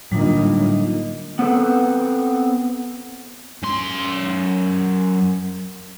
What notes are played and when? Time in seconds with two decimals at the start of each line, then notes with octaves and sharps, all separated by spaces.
0.12 A2 D3 F#3 G3 A#3 D4 D#4 F4
1.39 B3 C4 A4 B4
3.63 F#2 C6